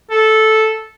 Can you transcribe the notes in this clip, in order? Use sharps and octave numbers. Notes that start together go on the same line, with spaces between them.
A4